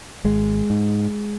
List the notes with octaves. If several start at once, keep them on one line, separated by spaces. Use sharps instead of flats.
G#1 G#3
G#2